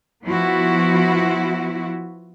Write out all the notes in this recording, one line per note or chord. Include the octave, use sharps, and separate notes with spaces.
F3 B3 E4 F#4